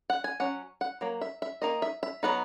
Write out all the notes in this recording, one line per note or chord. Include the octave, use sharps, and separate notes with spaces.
F#5
G#5
F#3 C#4 F#5
F#5
F#3 A#3
E5
E5
D#3 A#3 D#4 D#5
E5
E5
F#3 B3 D#4 F#5